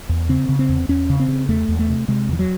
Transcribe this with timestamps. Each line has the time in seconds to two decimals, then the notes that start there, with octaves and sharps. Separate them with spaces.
0.09 E2
0.29 C#3 C4
0.49 C#3
0.59 C4
0.69 E2
0.89 E2 C#4
1.10 C#3
1.20 C4
1.28 C#3
1.48 E2 A3
1.69 E2
1.79 A3
1.89 C3
2.08 C3 G#3
2.29 E2 E3
2.39 F#3